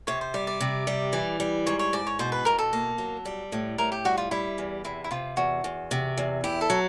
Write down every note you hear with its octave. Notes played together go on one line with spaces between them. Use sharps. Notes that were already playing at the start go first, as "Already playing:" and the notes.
C3 C#5
C5
G3 D5
D5
C3
G3
E3
G3
G#2 C#5
C#5
G#2 D5
C#5
B2 C5
B4
B2 A#4
A4
A#3
F#3
G3
A2
A2 A#4
G4
G3 F#4
F4
G3 E4
E2
C3 E4
E4
C3 F4
E2 F#4
E2
C3
E2
E4 G4
A4
F#3